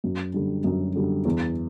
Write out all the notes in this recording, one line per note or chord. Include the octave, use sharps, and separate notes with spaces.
F#2
D3 G3
F#2
D3 G3
E2